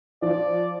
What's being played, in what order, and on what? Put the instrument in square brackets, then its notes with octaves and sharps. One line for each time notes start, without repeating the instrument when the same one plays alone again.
[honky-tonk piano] F3 [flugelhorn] D5